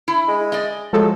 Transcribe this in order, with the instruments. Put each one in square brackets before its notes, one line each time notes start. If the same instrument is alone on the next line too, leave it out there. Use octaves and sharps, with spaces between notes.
[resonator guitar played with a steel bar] E4
[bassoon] G#3
[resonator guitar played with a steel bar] D5 D#5
[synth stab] F3 G#3 A4 [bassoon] F#3